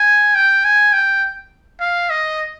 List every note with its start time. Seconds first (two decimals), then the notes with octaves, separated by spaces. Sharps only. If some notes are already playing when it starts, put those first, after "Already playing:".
Already playing: G#5
0.35 G5
0.64 G#5
0.93 G5
1.80 F5
2.10 D#5